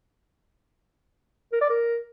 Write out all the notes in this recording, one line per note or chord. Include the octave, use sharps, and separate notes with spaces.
A#4
D5
A#4